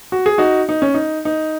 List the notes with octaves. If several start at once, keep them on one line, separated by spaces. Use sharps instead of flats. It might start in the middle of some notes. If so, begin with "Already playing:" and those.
F#4
G#4
D#4 F#4
D#4
C#4
D#4
D#4